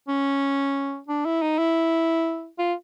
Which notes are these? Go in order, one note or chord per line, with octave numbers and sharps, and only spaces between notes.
C#4
D4
E4
D#4
E4
F4